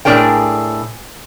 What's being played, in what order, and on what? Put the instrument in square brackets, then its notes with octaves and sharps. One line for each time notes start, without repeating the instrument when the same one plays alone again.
[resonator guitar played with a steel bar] A2 A3 D4 G#4 A#4 G5